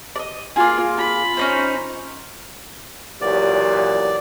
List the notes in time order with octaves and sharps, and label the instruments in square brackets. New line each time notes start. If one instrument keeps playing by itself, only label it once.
[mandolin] D5 D#5
[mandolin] A#3 G#4 [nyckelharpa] F4
[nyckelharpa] F4 B5
[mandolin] C#4 D#4 C5
[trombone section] E2 A#2 F#3 [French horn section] G4 [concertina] D5